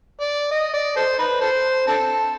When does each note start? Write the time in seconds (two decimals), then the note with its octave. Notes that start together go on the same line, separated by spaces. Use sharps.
0.21 D5
0.51 D#5
0.73 D5
0.96 A4 C5
1.19 D#4 B4
1.41 A4 C5
1.87 C4 D4 A4